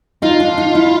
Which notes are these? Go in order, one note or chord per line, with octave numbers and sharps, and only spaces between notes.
D#4 F4
D4
D#4
E4